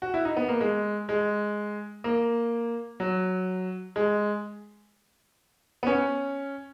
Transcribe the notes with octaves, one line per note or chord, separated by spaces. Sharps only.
F#4
E4
D#4
B3
A#3
G#3
G#3
A#3
F#3
G#3
B3
C#4